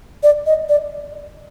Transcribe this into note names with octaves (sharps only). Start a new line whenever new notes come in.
D5
D#5
D5